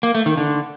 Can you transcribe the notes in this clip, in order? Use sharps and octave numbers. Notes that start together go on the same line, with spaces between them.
A#3
A3
D#3
D3